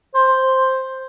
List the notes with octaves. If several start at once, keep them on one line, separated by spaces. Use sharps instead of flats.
C5